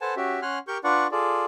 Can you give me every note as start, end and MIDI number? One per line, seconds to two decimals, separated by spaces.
0.01 0.15 69
0.01 0.15 71
0.01 0.15 72
0.01 0.15 78
0.01 0.15 80
0.01 0.15 81
0.17 0.40 61
0.17 0.40 66
0.17 0.40 67
0.17 0.40 76
0.42 0.59 61
0.42 0.59 78
0.42 0.59 80
0.42 0.59 84
0.42 0.59 89
0.42 0.59 90
0.68 0.78 67
0.68 0.78 70
0.68 0.78 85
0.68 0.78 91
0.84 1.07 62
0.84 1.07 65
0.84 1.07 71
0.84 1.07 74
0.84 1.07 78
0.84 1.07 85
1.12 1.46 65
1.12 1.46 68
1.12 1.46 69
1.12 1.46 74